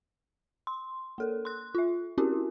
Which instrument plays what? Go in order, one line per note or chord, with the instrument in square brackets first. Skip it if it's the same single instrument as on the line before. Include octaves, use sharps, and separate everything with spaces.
[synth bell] C6
A#3 A4 A#4
C6 F#6
F4 E5
C4 C#4 E4 F#4 G4 A#4